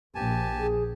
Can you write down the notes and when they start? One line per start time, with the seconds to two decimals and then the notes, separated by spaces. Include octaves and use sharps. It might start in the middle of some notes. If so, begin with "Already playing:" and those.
0.15 A#1 G4 G#5 A5
0.59 G#4